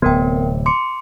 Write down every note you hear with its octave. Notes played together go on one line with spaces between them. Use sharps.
D1 C3 B3 A#4 G5
C6 D6 C#7